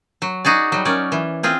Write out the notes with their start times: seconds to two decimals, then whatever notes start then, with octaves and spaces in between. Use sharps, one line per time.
0.22 F#3
0.45 D#4 F#4 G#4 D5
0.72 F#3 G3
0.85 C#4 D#4 A#4 D5
1.12 E3
1.43 C4 F4 G#4